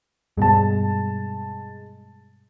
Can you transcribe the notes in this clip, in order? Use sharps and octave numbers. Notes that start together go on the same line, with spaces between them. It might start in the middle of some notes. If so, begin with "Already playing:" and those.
G2 B2 G#3 A5